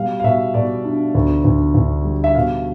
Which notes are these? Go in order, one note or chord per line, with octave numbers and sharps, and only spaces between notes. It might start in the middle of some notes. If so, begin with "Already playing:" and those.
Already playing: B2 G3 F5
F5
B2 E5
B2 D5
D4
D2
D2
D2
G3
E5
B2 F5